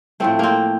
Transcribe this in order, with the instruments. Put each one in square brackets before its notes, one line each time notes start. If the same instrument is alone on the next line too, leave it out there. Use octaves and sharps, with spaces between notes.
[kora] A2 F3 A3 C4
A#3 C4